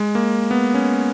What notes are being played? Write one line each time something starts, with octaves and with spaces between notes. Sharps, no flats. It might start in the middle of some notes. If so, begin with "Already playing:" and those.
Already playing: G#3
A#3
B3
C#4